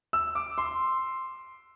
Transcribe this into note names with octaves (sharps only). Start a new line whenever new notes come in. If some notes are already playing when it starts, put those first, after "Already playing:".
E6
D6
C6